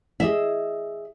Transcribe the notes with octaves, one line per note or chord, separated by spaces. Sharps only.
G#4 D#5 E5